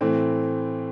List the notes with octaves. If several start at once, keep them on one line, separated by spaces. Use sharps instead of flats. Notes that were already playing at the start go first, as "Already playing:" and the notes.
A2 E3 A3 C4